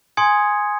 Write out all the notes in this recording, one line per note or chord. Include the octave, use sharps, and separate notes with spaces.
G#5 C6 D#6 G#6 C#7